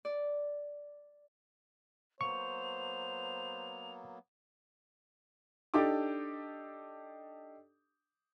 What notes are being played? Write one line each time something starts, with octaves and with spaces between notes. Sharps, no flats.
D5
F#3 A#3 B3 C5 C#6 F7
D4 D#4 G4 A4 D6